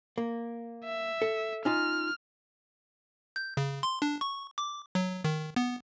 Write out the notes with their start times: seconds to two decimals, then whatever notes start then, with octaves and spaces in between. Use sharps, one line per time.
0.18 A#3
0.85 E5
1.22 A4
1.65 C#4 D#4 F4 F6
3.36 G6
3.57 C#3
3.83 C6
4.02 D4
4.21 C#6
4.58 D6
4.95 F#3
5.24 D#3
5.56 B3